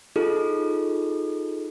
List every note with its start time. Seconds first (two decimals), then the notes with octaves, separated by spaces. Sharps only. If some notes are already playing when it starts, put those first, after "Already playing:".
0.16 D#4 F4 G#4 A4